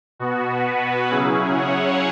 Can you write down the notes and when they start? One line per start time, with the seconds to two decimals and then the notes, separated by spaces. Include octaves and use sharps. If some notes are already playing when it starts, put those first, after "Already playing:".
0.19 B2 B3 F#4
0.65 F#4 B4
1.10 C#3 F#3 C#4 E4 G#4
1.55 C#5 F#5